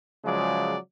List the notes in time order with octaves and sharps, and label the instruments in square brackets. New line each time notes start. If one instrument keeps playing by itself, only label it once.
[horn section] C#3 F3 F#3 G#3 D5